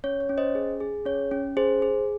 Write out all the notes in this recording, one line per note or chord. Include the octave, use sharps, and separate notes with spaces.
C#4 C#5
C#5
C#4
C5 D#5
G#4
G#4
C#4 C#5
C#4
G#4 C5
G#4